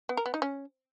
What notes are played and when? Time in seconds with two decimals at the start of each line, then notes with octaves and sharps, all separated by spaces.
0.09 B3
0.17 A#4
0.26 B3
0.34 D#4
0.42 C#4